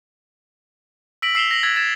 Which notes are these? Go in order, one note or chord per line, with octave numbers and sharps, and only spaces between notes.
E6 A#6 B6 D7 F#7
E6 C7 E7 F7 G7
A#6 F#7
E6 F#6 G#6 A6 B6
G#6 A6 E7